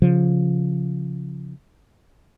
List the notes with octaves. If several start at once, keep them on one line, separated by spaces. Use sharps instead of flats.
C#3 F3